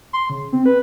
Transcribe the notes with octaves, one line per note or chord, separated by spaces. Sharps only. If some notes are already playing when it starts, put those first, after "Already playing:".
C6
C#3
C4
B4